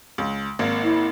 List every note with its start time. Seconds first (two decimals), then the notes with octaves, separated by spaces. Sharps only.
0.18 C#2
0.59 G#1 A#3
0.84 E4